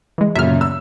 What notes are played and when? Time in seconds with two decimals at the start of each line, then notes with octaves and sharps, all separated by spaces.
0.18 E3 G#3
0.36 F#2 A#2 C#3 E5 F6
0.61 E6